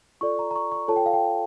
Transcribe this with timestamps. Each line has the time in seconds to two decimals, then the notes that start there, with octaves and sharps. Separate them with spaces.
0.21 F4 A4 D5 C#6
0.39 A#5
0.51 A#5
0.56 C#6
0.72 C#6
0.88 F4 A4 C#5 A5
0.96 G5
1.06 F5
1.13 G5